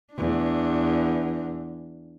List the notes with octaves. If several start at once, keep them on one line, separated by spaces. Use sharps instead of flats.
E2 D4